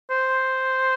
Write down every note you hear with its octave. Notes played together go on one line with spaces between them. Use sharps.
C5